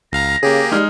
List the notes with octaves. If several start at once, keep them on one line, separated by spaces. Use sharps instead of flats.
C#2 F5 A#5 A#6
C#3 A#3 G4 G#4
G3 G#3 D#4 F6